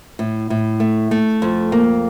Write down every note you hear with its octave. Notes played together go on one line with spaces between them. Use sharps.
A2
A2
A3
A3
F2
A#3